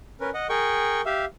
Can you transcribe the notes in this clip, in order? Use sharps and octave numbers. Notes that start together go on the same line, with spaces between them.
C#4 A#4 B4
D#5 F#5
G#4 A#4 G5 C#6
G4 E5 F5